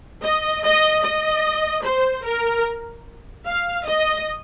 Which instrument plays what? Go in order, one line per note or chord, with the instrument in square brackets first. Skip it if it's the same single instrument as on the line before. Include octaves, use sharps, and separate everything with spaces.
[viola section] D#5
D#5
D#5
C5
A#4
F5
D#5